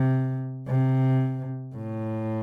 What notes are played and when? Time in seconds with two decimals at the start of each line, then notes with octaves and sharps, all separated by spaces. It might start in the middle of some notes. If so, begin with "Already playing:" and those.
Already playing: C3
0.68 C3
1.75 A2